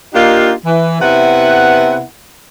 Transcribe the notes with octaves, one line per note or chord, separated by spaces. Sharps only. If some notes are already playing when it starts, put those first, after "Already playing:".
A#3 D4 D#4 F4 G4
E3
C3 B3 E4 F#5